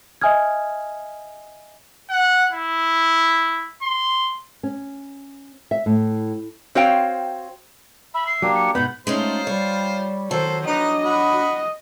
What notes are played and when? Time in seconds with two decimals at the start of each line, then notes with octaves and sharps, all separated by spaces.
0.22 D#5 E5 G#5 D#6 F6 G#6
2.10 F#5
2.52 E4
3.83 C6
4.63 C#4
5.71 E5
5.86 A2
6.75 C4 F#4 C5 C#5 F5 G5
8.14 E5 B5
8.27 C7
8.42 F#3 A#3 D4 G4
8.55 C#7
8.75 G#2 B2 B3 F#5 B5 G6
9.07 G#3 A3 C#4 D#4 F4 C5
9.47 G3 C#5
10.31 D#3 F#3 A4 C5
10.67 D4 D#4 B4 D#5
11.04 F#4 B5